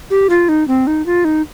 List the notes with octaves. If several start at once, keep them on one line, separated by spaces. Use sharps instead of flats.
G4
F4
D#4
C4
D#4
F4
D#4